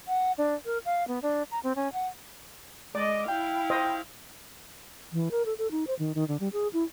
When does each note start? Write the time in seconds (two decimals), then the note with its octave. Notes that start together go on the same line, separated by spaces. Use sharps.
0.08 F#5
0.38 D4
0.65 A#4
0.85 F5
1.08 B3
1.23 D4
1.51 A#5
1.63 C4
1.76 C#4
1.93 F#5
2.95 G#3 D5 D#5 D6
3.28 E4 F5 G5
3.70 C5 D#5
5.13 E3
5.31 A#4
5.46 A4
5.58 A4
5.71 D#4
5.87 C5
5.99 D#3
6.15 D#3
6.28 D3
6.40 G3
6.53 G#4
6.73 E4